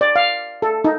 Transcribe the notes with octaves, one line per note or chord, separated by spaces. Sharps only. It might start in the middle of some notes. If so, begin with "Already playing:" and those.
D5
F5
A4
D#4